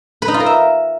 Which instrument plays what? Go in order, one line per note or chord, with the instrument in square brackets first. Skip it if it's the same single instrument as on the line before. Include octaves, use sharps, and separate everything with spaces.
[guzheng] B4
D#4
F4
A#4
E5